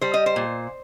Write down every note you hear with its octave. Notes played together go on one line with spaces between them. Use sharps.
G3 C5
D#5
C5
A#2